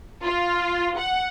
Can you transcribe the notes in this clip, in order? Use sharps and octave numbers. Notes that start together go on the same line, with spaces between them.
F4
F#5